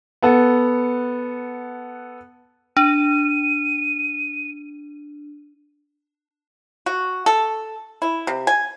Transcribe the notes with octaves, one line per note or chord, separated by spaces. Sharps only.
B3 A4 F#5
D4 D#7
F#4
A4
E4
C3
G#5